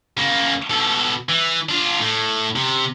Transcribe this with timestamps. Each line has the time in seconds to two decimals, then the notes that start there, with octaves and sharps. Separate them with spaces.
0.17 C#3 A#3
0.70 B2 A4
1.29 E3
1.69 D4 F4
2.00 A2
2.56 C3